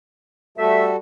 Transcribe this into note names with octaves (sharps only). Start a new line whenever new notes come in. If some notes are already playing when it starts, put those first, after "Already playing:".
G3 A3 F#4 A4 E5